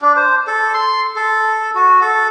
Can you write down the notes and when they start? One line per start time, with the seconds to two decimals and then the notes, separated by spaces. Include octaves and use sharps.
0.02 D4
0.16 C5
0.47 A4
0.74 C6
1.16 A4
1.75 F#4
2.01 A4